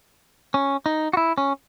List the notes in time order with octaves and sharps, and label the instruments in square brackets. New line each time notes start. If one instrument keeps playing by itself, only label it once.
[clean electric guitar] C#4
D#4
F#4
E4
C#4